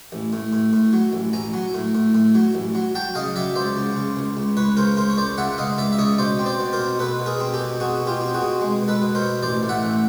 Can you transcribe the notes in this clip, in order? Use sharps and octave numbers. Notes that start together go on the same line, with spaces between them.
A1
A2
A2
A2
F#3
A1
A1 G#5 A#5
F#3
A2
A2
A2
F#3
A1
F#3
F#3 G5 A5
C#3 D#5 F5
F#3 D5 E5
C#2 C5 D5
C#3
C#3
C#2
C#2
C#2 B4 C#5
C#3 A#4 C5
C#2 A#4 C5
C#5
C#2 C5 D5
C#3 E5 F#5
C#2 D#5 F5
C#2 D5 E5
E5
C#3 C#5 D#5
B2 C5 D5
C4
C5 D5
B2
A#4 C5
B2
B2 A4 B4
B2
G#4 A#4
C4
G4 A4
B2
B2 F#4 G#4
B2
F4 G4
C4
F#4 G#4
B2
G#3
B2
A4 B4
B2
A#4 C5
B2
A1 C5 D5
A2
E5 F#5
A1